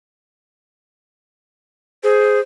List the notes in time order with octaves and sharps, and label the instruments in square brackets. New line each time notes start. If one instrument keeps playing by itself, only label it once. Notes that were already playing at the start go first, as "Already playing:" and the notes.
[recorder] G#4 [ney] C5